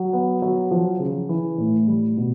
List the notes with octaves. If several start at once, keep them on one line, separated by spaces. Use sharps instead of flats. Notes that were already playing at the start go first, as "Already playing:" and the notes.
Already playing: F#3
B3
F#3
F3
C#3
E3
A2
G3
B2